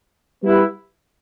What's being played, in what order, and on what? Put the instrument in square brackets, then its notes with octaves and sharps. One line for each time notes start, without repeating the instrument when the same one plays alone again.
[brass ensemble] G3 B3 E4 G4 B4